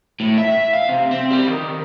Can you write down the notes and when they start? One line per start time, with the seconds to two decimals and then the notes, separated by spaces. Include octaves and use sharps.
0.20 A2
0.38 E5
0.74 F5
0.89 C3
1.11 C4
1.31 G3
1.48 D#3